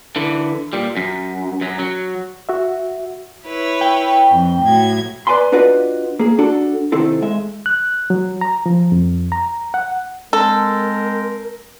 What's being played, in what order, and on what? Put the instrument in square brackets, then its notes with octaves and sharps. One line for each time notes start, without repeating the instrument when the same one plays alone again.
[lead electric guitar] D3 E3
A#2 G3
F#2
F#2 F#3
F#3
[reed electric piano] F#4 E5
[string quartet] E4 B4 C#5
[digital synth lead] G5
[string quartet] F2
A2 F#3 G#6
[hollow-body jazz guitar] B4 D5 G#5 B5 C6
D4 F4 F#4 B4 D5 D#5
A#3 G#4
D4 F#4 A4
C3 D#3 C4 E4 A4
G#3 E5
[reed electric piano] F#6
F#3
A#5
F3
F2
A#5
F#5
[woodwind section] G#3 C4 A#4 [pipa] A4